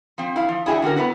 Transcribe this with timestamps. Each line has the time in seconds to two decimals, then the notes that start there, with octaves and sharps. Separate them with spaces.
0.18 F3 C4
0.36 E4 F5
0.49 F3
0.66 D4 E4 F#4 G#4 E5 G5
0.82 D3 C#4 F#4 A#4
0.96 B3 C4 E4 B4